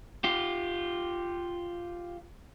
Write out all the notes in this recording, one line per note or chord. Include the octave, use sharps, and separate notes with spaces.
F4 G4